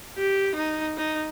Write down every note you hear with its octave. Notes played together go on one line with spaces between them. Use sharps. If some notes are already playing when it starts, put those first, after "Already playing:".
G4
D#4
D#4